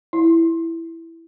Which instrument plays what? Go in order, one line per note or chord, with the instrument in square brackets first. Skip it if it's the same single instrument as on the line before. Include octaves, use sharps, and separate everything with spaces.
[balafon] E4